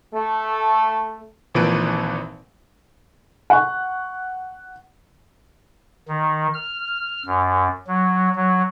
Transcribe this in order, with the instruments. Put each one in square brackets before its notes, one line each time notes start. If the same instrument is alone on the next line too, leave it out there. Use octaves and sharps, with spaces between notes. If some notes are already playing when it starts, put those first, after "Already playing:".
[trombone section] A3
[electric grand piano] G#1 A#2 E3 F3 B4 D7
[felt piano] F#5 C#6
[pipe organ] D#3
F6
F#2
F#3
F#3